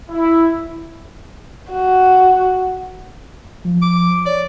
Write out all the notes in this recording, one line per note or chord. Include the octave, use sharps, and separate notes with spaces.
E4
F#4
F3
D6
C#5 D5